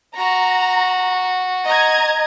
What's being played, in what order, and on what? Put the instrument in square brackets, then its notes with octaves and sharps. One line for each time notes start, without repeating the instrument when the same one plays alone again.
[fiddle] F#4 [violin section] A#5
[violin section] D#5 A#5 G#6